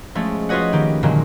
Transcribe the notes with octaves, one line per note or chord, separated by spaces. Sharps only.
F3 G#3 A3 C#4
F4 F#4 B4 C#5 D#5 F#5
D#3 G4
A#2 D3 D#3 F#3 G#3 A#3